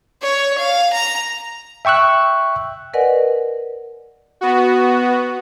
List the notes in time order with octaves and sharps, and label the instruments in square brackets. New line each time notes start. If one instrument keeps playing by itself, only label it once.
[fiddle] C#5
F5
A#5
[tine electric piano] E5 G5 C#6 E6 F#6
[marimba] A#4 B4 D5 D#5 F#5 G#5
[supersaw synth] B3 F#4